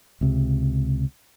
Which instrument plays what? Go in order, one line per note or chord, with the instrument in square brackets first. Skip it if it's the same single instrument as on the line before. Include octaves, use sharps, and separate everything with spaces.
[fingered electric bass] C#2 C3